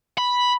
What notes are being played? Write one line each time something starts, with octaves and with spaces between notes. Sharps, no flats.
B5